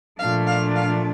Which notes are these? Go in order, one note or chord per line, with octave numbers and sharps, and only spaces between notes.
A#2 F3 A3 D4 F5
F5
F5